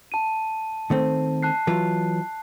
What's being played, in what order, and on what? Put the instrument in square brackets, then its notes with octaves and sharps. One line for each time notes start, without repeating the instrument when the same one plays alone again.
[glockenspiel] A5 D#7
[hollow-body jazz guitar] D#3 A3 C4
[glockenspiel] A5 F#6 C7
[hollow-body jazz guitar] E3 F#3 F4